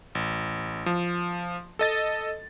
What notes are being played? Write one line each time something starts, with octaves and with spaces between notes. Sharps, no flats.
A1
F3
A4 D#5 A6